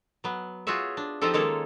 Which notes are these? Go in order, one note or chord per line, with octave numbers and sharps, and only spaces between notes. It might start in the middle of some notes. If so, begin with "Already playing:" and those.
F#3 B3
F4 F#4 G#4 C#5 E5
D4
F3 C4 D#4 F4 G4 A4
D#3 G#3 A#3 C#4 A4 C#5